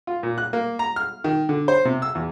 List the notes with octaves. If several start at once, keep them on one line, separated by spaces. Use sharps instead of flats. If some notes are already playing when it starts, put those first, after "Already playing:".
F4
A#2
F#6
A#3
A#5
F6
D#3
D3
C5
C3
E6
E2